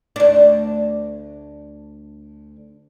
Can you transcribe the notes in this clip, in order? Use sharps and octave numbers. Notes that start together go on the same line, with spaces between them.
D2 D4